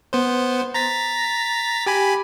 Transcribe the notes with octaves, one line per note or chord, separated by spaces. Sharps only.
B3 C5
A#5 A6 B6
G4 G#5 B5